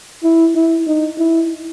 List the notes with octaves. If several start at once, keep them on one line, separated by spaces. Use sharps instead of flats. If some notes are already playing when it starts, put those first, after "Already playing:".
E4
E4
D#4
E4